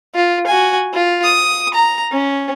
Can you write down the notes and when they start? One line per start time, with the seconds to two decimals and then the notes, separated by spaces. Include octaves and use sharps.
0.15 F4
0.46 F#4 G#5
0.93 F4
1.24 D#6
1.74 A#5
2.12 C#4